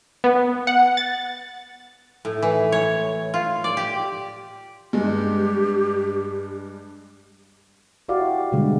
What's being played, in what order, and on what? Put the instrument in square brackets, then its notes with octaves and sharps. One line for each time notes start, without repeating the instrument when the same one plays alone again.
[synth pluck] B3
F#5
A6
[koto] A2
E3
C#5
F4
D5
G4
[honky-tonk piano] G2 G#3 [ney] G4
[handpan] E4 F#4 G4 D5 F5
B2 D3 G3 G#3